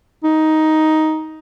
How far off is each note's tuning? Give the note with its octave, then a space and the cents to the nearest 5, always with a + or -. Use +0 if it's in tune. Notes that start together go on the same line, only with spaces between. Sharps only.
D#4 +10